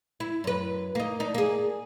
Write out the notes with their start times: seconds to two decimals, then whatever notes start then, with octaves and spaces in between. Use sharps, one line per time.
0.20 E4
0.44 F#2 B4
0.95 A#3 D#4
1.20 D4 D#4
1.35 A#3 G#4